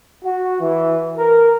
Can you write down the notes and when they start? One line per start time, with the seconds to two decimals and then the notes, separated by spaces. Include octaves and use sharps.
0.24 F#4
0.61 E3
1.18 A#4